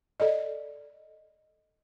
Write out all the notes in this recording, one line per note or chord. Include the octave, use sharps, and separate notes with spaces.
A4 D5 D#5